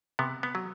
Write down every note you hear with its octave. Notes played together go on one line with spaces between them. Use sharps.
C3 B3
B3
F#3